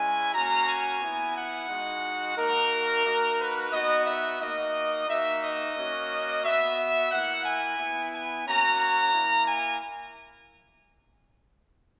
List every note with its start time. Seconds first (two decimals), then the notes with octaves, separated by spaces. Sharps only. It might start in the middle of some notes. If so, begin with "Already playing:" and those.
Already playing: G#3 C#4 E4 G#5
0.34 A#3 C#4 F#4 A#5
0.68 G#5
1.01 B3 E4
1.36 F#5
1.69 G#3 D#4 F#4
2.37 A#3 D#4 F#4 A#4
3.05 A#3 D#4 F#4
3.38 B4
3.72 B3 D#4 F#4 D#5
4.06 E5
4.40 A#3 D#4 F#4 D#5
5.08 A#3 D#4 F#4 E5
5.42 D#5
5.75 A#3 C#4 F#4
6.43 B3 F#4 E5
7.11 A#3 E4 F#5
7.45 G#5
7.79 B3 E4
8.13 G#5
8.46 A#3 C#4 F#4 A#5
8.80 A#5
9.14 A#3 E4
9.47 G#5